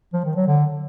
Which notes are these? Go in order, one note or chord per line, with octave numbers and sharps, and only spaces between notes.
F3
D#3
F#3
D3